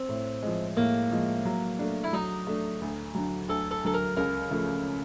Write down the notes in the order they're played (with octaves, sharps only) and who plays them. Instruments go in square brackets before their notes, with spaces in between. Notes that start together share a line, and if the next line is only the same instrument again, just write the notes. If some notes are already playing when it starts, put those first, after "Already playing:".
Already playing: [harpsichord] C4
[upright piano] A2
F3 G#3
[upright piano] A2 [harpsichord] A#3
[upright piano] F3 G#3
F#3
A3 D4
[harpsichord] E4
[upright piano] F#3 [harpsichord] D#4
[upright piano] A3 D4
D2
D3 F#3
[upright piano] D2 [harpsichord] A4
[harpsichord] A4
[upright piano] D3 F#3 [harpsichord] A4
[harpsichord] A#4
[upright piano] C#2 [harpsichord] A#4
[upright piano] C#3 F3 A3